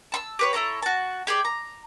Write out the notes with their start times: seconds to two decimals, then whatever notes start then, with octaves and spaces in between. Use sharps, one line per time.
0.12 A5 B5 E6
0.39 G4 B4 C#5
0.53 E4 A4 C#5 A#5
0.82 F#4 A5
1.27 G4 G#4 C5 D5
1.45 A#5